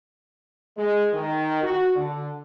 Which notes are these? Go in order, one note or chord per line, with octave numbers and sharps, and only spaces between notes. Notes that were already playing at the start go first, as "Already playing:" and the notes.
G#3
D#3
F#4
D3